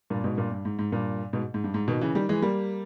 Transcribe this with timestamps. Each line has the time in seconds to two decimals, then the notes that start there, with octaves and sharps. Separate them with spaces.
0.10 G2 A#2
0.24 G#2 B2
0.37 G2 A#2
0.52 G2
0.65 G#2
0.79 G#2
0.92 G2 A#2
1.33 G#2 B2
1.54 G#2
1.64 G2
1.74 G#2
1.88 B2 D#3
2.01 C#3 E3
2.15 D#3 G3
2.29 E3 G#3
2.42 G3 A#3